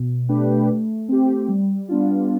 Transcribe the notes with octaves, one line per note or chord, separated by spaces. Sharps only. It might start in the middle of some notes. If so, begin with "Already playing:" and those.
Already playing: B2
A3 D4 G4 B4
A3
C4 G4
G3
B3 D4 F4